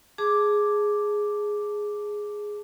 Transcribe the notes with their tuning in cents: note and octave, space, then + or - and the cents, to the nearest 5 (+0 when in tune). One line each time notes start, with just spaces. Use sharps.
G#4 +0 A5 +0 D6 +0